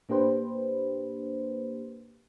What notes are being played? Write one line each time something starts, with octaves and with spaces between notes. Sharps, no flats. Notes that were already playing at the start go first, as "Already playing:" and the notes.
A2 A#3 D4 G4 B4 C5